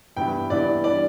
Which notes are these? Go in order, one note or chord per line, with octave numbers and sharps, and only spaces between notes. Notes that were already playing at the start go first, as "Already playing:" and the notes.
G2 E3 B3 E4 G5
G2 E3 B3 E4 D5
E3 G3 D4 D5